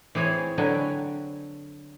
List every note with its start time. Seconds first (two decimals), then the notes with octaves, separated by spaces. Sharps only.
0.15 E3 C4 G#4 C5 C#5
0.58 D3 F#3 B4 G5 G#5